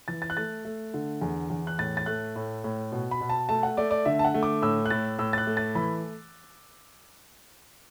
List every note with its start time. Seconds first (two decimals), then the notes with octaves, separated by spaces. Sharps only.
0.08 E3 A6
0.22 A6
0.30 F#6
0.37 A3 A6
0.65 A3
0.94 D3
1.21 E2
1.50 E2
1.67 F#6
1.78 A2 A6
1.97 A6
2.06 A3 F#6
2.36 A2
2.64 A2
2.92 B2
3.11 B5
3.21 B2
3.29 A5
3.49 A3 A5
3.63 F#5
3.77 A3 D5
3.91 D5
4.05 D3 E5
4.19 A5
4.25 F#5
4.34 A3
4.43 D6
4.62 A2 E6
4.86 F#6
4.90 A2 A6
5.19 A2 E6
5.33 A6
5.38 F#6
5.47 A3
5.57 A6
5.75 E3 B5